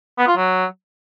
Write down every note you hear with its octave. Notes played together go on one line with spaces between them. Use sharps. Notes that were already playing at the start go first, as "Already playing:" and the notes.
B3
F4
F#3